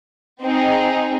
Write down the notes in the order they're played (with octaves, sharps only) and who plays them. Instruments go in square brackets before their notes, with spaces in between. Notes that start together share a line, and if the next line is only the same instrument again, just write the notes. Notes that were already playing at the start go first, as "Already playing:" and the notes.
[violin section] C4 D#4 G#4